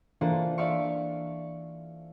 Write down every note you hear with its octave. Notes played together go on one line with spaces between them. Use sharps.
E3 A#3 D4 F4 A4 C5
D5 E5 F5 C6 C#6